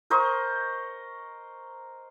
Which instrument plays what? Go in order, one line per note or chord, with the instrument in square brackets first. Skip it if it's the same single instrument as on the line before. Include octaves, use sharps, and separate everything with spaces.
[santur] A#4 C5 D#5 C#6